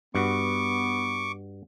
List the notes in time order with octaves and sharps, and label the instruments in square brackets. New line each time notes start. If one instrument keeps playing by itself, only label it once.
[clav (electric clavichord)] G2 F#4 [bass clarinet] B3 [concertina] C#6 D6